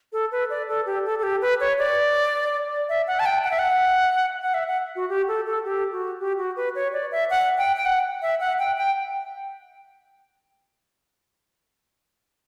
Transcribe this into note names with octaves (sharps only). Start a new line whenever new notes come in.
A4
B4
D5
A4
G4
A4
A4
G4
B4
C#5
D5
E5
F#5
A5
G5
F#5
E5
F#5
F#5
E5
F#5
F#4
G4
A4
A4
G4
F#4
G4
F#4
B4
C#5
D5
E5
F#5
G5
G5
F#5
E5
F#5
G5
G5